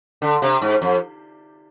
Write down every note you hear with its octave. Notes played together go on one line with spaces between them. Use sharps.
D3
C3
G#2
F2